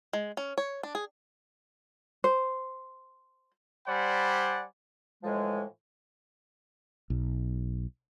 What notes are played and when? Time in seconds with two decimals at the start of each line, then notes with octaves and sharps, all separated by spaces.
0.13 G#3
0.37 C#4
0.58 C#5
0.83 D4
0.95 G#4
2.24 C5
3.87 G3 C5 D5 F#5 G#5 B5
5.24 A2 E3 F3 G#3
7.10 B1